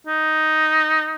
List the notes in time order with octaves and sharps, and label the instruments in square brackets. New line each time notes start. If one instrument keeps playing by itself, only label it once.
[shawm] D#4